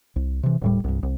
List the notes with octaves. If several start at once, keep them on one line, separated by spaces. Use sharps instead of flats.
C2
C3 E3
D#1 A2 G3
C2 G2
C2